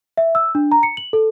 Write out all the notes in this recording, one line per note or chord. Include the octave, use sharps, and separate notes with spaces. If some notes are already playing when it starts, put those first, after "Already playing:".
E5
E6
D4
A#5
C#7
F#7
A4